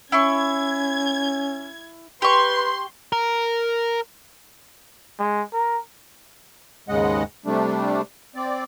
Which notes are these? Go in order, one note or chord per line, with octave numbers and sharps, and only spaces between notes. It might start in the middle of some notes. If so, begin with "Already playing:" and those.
C#4 E4 C#6 G#6
G4 B4 C6 C#6
A#4
G#3
A#4
D#2 G#2 C#3 G#3 D#5 F#5
C3 G3 A3 D4
C4 D5